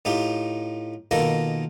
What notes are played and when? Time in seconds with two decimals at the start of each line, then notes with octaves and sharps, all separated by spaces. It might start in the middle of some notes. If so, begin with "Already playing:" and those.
0.05 A2 D#4 F4 G4
1.11 B2 D#3 A#3 F4 A4 A#4